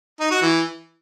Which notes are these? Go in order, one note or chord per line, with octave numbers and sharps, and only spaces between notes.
D#4
F#4
E3